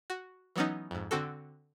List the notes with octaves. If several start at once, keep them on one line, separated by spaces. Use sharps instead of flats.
F#4
E3 F#3 B3 C#4 D#4
F2 G#2
D3 C4 F#4 A4